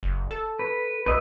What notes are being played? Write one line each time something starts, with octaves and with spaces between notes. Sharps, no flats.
F#1
A4
B4
B1 B4 D#5 E5